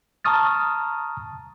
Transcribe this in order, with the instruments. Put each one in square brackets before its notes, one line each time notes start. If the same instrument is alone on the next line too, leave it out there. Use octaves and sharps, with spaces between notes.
[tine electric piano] A5 A#5 C#6 D#6 F6 A6